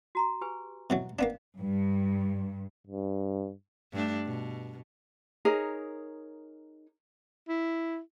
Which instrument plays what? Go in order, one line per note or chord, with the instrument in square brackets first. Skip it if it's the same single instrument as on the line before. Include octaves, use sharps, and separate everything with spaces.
[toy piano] F#4 A#5 C6
G4 B4 G#5
[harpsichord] B2 E3 F#3
[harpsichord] A#3 B3 D4 [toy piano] D#5 F5
[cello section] G2
[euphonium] G2
[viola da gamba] G2 A3 D4
B2
[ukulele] D#4 G#4 A#4 C#5
[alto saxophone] E4